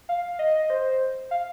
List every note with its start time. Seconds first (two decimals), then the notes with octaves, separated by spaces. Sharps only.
0.09 F5
0.39 D#5
0.70 C5
1.31 F5